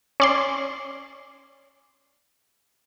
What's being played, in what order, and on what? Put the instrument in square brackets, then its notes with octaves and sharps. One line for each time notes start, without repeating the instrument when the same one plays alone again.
[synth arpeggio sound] C#4 D5 C6